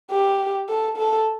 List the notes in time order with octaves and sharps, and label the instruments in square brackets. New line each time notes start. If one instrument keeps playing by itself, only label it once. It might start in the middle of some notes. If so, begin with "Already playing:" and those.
[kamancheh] G4
A4
A4